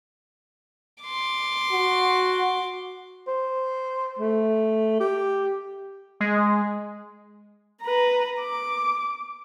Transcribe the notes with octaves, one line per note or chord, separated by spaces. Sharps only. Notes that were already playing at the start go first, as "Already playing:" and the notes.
C6 D6
F#4
C5
A3
G4
G#3
B4 A#5
D6